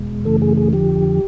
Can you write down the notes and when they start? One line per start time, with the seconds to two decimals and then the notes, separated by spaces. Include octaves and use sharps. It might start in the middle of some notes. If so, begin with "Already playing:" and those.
Already playing: E2 B2 G#3
0.25 F#2 C#3 E3 A3 A4
0.42 G#4
0.57 G#4
0.73 F2 D3 F3 G4